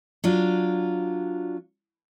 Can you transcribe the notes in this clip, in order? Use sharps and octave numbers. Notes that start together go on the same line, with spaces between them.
F#3 D4 F4